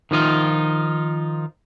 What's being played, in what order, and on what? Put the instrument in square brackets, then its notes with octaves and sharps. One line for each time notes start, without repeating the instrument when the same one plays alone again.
[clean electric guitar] D#3 F3 D#4 F4